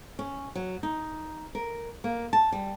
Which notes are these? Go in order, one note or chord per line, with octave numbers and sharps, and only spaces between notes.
C#4
F#3
D#4
A#4
A#3
A5
G3